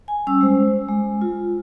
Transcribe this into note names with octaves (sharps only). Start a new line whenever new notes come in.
G#5
G3 C#4 E6
G#3 C5
G#3
F4